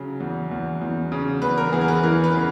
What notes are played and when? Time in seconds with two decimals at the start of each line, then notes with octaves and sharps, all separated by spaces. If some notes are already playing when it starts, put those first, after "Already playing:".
Already playing: C#3 F#3
0.20 E2
0.51 E2
0.81 E2
1.12 C#3
1.42 E2 B4
1.58 A#4
1.73 E2 G#4
1.81 A#4
1.88 B4
2.03 E3 A#4
2.24 B4
2.34 C#3